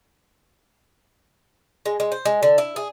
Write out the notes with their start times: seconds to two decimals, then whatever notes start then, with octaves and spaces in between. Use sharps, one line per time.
1.86 G#3
2.00 G#3
2.12 C5
2.25 G#3
2.43 D3
2.58 E4
2.76 G#4